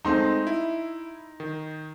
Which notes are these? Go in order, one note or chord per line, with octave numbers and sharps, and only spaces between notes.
G#3 A3 C4 D#4 C6
E4
D#3